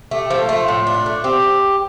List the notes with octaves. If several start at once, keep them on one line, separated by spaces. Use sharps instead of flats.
A3 G4
G4
F3
A4
A3 F4
A2
D4
A3
C4 G4